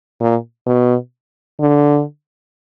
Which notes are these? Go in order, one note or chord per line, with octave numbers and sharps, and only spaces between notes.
A#2
B2
D3